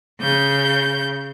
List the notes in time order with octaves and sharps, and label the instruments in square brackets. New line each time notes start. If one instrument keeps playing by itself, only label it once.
[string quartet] C#3 G6